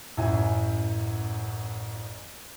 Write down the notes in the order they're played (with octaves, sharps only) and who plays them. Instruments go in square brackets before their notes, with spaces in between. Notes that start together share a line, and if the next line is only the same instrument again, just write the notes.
[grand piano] A1 F#2 E4 G#5